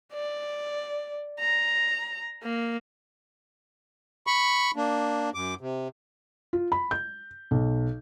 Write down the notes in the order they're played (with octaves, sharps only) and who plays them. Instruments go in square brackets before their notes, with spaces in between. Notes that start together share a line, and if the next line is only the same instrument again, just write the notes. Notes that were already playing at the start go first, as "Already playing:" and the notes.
[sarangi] D5
A#5
A#3
[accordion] B5 C#6
A#3 D4
F#2 D6
C3
[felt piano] F4
B5
G6
B1